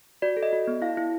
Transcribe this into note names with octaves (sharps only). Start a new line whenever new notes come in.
F#4 D5
A4
D#5
F#4
B3
E4 F5
E4